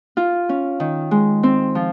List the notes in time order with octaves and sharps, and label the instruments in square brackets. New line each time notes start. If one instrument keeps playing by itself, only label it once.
[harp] F4
C#4
D#3
G#3
C4
F3